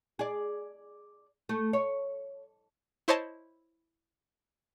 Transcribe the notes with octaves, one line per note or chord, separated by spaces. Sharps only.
G#4 D5
A3
C#5
E4 C5 C#5 D#5 A5